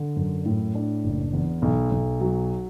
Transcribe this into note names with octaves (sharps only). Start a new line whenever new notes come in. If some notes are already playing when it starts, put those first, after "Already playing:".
Already playing: D3
F#2
A2
D4
F#1
E2
B1
B1
F#3